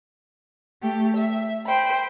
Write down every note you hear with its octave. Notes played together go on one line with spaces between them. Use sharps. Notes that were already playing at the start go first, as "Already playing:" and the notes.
A3 G4
E5
C5 G5 B5